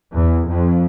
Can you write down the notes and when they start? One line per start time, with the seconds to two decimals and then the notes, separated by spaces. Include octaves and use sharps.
0.12 E2
0.47 F2